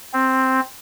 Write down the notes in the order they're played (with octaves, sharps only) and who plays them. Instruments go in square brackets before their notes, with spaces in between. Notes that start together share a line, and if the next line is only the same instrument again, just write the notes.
[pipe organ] C4